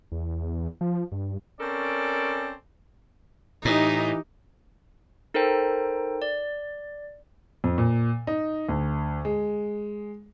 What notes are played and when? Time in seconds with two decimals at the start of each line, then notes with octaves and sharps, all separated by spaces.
0.12 E2
0.81 F3
1.12 G2
1.60 C4 C#4 A4 A#4 D5
3.65 A2 E3 D#4 G4
5.34 D#4 A4 A#4 C5 G5
6.22 D5
7.64 F2
7.78 A#2
8.27 D#4
8.69 D2
9.25 G#3